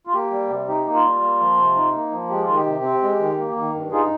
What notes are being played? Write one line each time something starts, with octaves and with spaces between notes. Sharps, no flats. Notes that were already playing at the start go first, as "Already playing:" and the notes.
F4
A#3 G4
G3
C3
D#4 G4
A#3
F4
G3
A#3
F3
C3
D#4
A#3
F3
G#3 G4
F4
D#3
G4
C3
C4
G#3
D#3
A#3
D#3
G2
D#4 F4 G#4